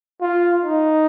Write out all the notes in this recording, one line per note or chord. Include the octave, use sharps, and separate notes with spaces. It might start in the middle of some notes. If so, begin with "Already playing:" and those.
F4
D#4